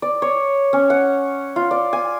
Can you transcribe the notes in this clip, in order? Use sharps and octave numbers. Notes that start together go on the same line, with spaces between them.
D5
C#5
C#4
F#5
F4
D5
G#5